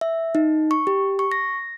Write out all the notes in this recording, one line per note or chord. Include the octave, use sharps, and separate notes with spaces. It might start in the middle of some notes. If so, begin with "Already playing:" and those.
E5
D#4
C#6
G4
C#6
A#6